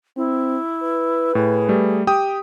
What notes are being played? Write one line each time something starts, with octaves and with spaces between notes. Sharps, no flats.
C4 E4
B4
A2 G#4
G3 A3
G4 G5 D#6